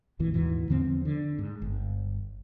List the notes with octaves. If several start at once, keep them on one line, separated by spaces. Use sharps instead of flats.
A1 F2 A#2 E3
D#2 G#2 B2 E3
E2 D3 F3 C4
D3
G#2
G1